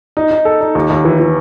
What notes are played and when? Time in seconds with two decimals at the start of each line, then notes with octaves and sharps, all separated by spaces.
0.17 D#4
0.31 D#4
0.45 A4
0.61 D#4
0.75 D#2
0.90 D#2
1.05 E3
1.19 E3